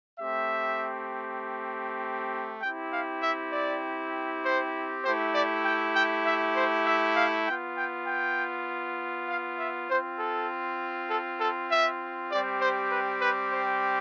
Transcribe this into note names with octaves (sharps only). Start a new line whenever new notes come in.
A3 C4 G4 E5
C4 E4 G4 G5
F5
E5
D5
C5
A3 E4 G4 C5
D5
G5
G5
E5
C5
E5
F5
B3 F4 G5
G5
G5
F5
E5
C4 F4 C5
A4
A4
A4
E5
G3 C4 G4 D5
C5
B4
B4
C5